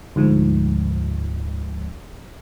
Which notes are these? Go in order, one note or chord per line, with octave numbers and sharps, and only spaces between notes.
D2 G#2 F3